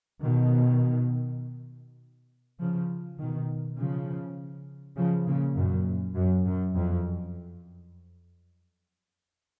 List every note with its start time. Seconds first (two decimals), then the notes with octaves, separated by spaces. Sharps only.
0.22 B2 D#3
2.59 C#3 F3
3.19 B2 D#3
3.78 C#3 F3
4.96 C#3 F3
5.27 A#2 C#3
5.55 F#2 A#2
6.15 F#2
6.45 F#2
6.75 F2